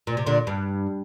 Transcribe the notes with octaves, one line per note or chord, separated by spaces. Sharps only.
A#2
C3
A#2 D3
G2